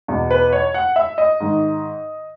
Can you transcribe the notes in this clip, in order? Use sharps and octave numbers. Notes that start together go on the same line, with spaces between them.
E2 B2
B4
C#5
F#5
E5
D#5
G#2 D#3